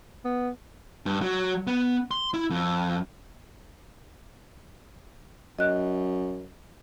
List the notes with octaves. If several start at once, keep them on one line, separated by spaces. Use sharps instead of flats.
B3
G2
F#3
B3
C6
E4
F2
F#2 D#5 F#6